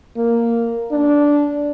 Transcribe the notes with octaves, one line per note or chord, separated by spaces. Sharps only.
A#3
D4